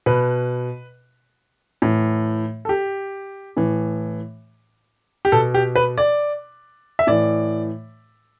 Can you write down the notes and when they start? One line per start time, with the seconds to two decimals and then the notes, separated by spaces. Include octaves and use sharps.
0.06 B2 B4
1.82 A2 E3
2.65 A4
2.69 G4
3.57 A2 E3
5.25 G4
5.32 B2 A4
5.54 G4
5.76 B4
5.98 D5
6.99 E5
7.07 A2 E3 D5